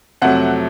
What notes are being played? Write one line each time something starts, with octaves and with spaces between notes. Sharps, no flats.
F2 C3 F#3 A3 F#5